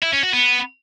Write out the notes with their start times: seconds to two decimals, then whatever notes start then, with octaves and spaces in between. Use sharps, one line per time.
0.03 E4
0.13 C#4
0.23 F#4
0.34 B3